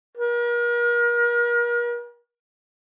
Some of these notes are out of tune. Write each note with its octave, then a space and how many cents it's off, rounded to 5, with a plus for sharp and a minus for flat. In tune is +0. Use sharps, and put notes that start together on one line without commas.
A#4 +40